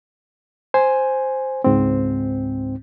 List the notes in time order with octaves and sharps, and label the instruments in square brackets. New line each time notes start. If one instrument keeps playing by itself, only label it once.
[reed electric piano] C5 G#5
C#2 G#2 C4